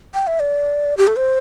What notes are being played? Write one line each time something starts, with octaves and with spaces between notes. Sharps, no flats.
G5
E5
D5
G4
A4
C5